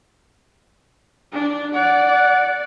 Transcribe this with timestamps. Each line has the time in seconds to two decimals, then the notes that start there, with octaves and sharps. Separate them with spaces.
1.32 D4
1.75 D5 F#5